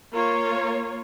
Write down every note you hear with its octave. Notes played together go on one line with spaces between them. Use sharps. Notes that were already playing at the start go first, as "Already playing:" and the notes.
A#3 F4 C#5